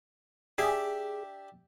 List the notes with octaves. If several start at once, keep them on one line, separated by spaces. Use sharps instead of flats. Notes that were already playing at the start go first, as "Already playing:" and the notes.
D4 G4 G#4 E5